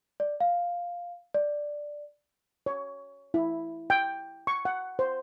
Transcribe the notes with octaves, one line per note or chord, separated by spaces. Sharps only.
D5
F5
D5
C#5
E4
G5
C#6
F#5
C5